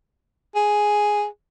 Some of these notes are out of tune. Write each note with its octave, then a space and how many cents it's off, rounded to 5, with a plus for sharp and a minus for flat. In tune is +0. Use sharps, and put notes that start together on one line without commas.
G#4 +5